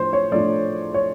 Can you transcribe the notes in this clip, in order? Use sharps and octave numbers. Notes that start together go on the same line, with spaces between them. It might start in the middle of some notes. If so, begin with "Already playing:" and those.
Already playing: A2 F3 A3 D4 C5
C#5
A2 F3 A3 D4 D5
C#5